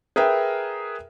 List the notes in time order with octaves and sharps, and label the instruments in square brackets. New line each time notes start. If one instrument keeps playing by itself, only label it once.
[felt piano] G#4 A#4 B4 E5 G5